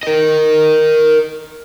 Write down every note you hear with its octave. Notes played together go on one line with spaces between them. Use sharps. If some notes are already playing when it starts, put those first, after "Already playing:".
A#4 D#5